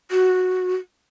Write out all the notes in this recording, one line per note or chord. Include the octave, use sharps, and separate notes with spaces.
F#4